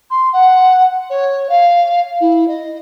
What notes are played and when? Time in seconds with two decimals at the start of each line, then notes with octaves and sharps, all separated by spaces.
0.10 C6
0.33 F#5
1.10 C#5
1.49 F5
2.20 E4
2.48 D#5